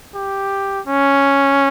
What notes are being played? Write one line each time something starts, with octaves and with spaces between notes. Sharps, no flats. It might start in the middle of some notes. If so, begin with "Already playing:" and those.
G4
C#4